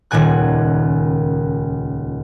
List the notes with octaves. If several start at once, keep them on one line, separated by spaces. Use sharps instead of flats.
D#1 C#2 A#2 D#3 G#5 F#6